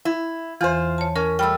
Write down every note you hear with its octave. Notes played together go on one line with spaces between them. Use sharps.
E4
E2 E3 F4 C5
C#5 A5
C#4 A#4
G3 A3 G5 B5 E6